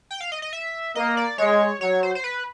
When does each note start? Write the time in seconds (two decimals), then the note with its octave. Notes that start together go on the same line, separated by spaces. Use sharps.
0.11 G5
0.21 F5
0.32 D#5
0.42 D#5
0.53 E5
0.95 A#3 D#5
1.17 D5
1.38 G#3 C#5
1.81 F#3 C#5
2.03 C5
2.15 C5
2.24 B4